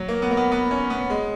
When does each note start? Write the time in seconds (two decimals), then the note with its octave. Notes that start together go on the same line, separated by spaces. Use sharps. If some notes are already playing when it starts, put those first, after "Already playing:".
Already playing: F#3
0.08 A#3
0.22 B3
0.31 A#3
0.37 B3
0.52 B3
0.71 C#4
0.90 B3
1.10 G#3